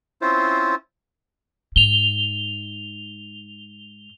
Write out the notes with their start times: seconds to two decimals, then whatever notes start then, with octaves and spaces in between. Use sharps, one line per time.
0.22 C4 C#4 E4 F4 C5
1.76 G#2 F7 G7